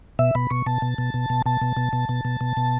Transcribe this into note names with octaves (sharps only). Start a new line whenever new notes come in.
B2 E5
B2 B5
B2 C#6
B2 A5
B2
B2
B2
B2
B2 A5
B2
B2
B2
B2
B2
B2
B2